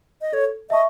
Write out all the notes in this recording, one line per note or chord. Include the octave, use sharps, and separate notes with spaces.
D#5
A4 C#5
D#5 E5 A5 C#6